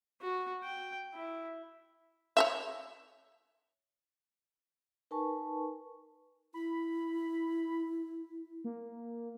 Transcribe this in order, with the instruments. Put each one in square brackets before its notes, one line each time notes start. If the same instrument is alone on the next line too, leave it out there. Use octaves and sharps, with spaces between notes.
[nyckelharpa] F#4
G5
E4
[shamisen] C#5 D#5 E5
[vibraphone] D#4 A#4 B4 G#5 A5 C#6
[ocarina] E4 [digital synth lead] B5
[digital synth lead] A#3